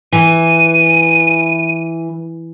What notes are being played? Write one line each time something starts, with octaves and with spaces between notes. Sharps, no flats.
E3 D#7